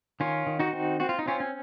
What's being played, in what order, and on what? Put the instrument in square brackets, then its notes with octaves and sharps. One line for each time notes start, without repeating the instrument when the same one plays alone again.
[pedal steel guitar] D#3 C#4 F4
D#3
D#4 F#4
C4
C4 F#4
F4
D#4
C4 C#4 F4
C#4